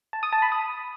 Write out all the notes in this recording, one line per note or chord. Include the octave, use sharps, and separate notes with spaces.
A5
D#6
A5
B5
D#6